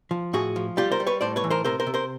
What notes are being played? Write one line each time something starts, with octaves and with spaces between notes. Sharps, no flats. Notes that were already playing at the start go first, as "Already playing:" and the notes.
F3
A2 F#4 G#4
F3
G3 F4 G4
A#4 C5
G3
B4 C#5
A2 C5 D5
B4 C#5
E3
A#4 C5
C3 A#4 C5
A#4 C5
C3
A#4 C5